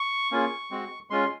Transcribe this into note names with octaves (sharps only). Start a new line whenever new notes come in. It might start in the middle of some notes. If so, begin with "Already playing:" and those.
Already playing: C#6
A#3 C#4 F4 G#4
G#3 C4 F#4
G#3 C#4 F4 C6